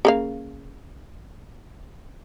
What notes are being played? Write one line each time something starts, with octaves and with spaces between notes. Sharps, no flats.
C#3 A#3 F5